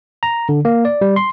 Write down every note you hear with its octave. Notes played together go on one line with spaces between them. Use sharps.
A#5
D3
A#3
D5
G3
C6